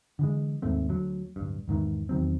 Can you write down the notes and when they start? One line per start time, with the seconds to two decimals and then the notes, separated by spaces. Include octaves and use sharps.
0.19 D3 E3 G#3
0.62 D#2 G#2 A3 C4
0.89 D2 F#3
1.36 D1 G2
1.68 E2 G#2 D#3 E3
2.09 E2 D#3 F#3 C4